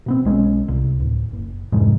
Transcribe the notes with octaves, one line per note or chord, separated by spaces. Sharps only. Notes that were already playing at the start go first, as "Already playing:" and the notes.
B2 B3 C4
B1 G#3 C#4
C2
D1
F#1
C2 F2 G#2